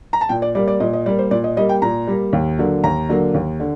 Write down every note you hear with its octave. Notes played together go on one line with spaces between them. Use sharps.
A#5
A5
A#2 G5
D5
G3 A#3 D5
D5
A#2 D#5
D#5
G3 A#3 D5
C5
A#2 D5
D#5
G3 A#3 D#5
G5
A#2 A#5
G3 A#3
D#2
D3 F#3 A#3
D#2 A#5
D3 F#3 A#3
D#2
D3